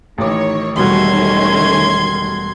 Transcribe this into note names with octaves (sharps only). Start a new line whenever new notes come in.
A1 D#3 C#5 D6
E1 D#3 G3 A3 C#4 F#4 C6 G#6